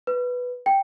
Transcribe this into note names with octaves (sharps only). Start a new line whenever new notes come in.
B4
G5